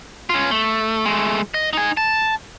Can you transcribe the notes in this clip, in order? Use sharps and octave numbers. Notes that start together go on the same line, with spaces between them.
C#4 F4
A3
G#3 A3
D#5
D#4 G#5
A5